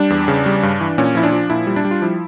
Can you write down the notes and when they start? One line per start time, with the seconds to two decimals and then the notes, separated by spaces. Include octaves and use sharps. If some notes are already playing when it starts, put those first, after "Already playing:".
Already playing: G3 D4
0.10 E2
0.28 C#3
0.46 G3
0.63 G2
0.80 E3
0.98 A#2 C#4
1.15 F3 E4
1.23 D4
1.32 F3
1.50 A#2 E4
1.67 G3
1.76 D4
1.85 G3
1.91 F4
2.02 F3 E4